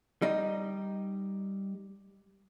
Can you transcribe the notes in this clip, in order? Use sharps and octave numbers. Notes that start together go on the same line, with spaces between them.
G3 D#4